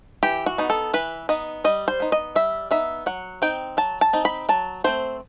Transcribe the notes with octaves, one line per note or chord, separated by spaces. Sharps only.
E3 G4
F#4
B3 D#4
A4
E3 B4
B3 D#4 D#5
G3 D#5
C5
B3 D#4
D#5
G3 E5
B3 D#4 E5
F#3 F#5
C4 D#4 G5
F#3 A5
A5
C4 D#4
B5
F#3 A5
A3 C4 C5